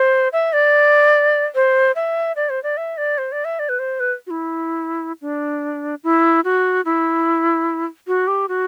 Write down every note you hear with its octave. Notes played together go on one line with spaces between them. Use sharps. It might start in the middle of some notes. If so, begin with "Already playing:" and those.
Already playing: C5
E5
D5
C5
E5
D5
C5
D5
E5
D5
C5
D5
E5
D5
B4
C5
B4
F#4
E4
D4
E4
F#4
E4
F#4
G4
F#4